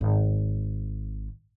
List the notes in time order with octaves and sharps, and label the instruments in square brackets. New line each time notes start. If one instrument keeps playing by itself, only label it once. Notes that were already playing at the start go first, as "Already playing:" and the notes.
[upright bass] G#1